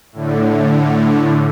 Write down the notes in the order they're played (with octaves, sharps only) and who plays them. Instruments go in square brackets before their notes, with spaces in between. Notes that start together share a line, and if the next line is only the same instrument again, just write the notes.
[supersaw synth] A2 D3